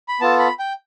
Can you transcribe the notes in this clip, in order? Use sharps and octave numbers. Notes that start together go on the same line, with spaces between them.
B5
B3 F4 A4 A5
B5
G5